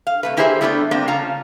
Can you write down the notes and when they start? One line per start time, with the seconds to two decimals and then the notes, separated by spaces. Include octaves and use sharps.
0.07 F5
0.23 C3 A3 B4
0.37 A#3 E4 G4 G#4 C5 E5
0.61 G3 A3 B3 D4 F#4 G4
0.91 A#3 C4 D4 A#4 G5
1.07 C#3 C#4 F4 A5 A#5